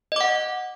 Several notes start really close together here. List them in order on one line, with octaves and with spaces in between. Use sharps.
D#5 D6 F#5